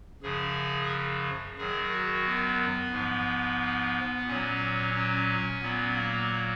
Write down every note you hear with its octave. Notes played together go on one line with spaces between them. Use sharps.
F#2 C#3 F3 G#4
F#2 D#3 F#3 G#4
F#4
B3
G#2 F3
A#2 F#3 C#4
C#4
A#2 F#3 B3
A#3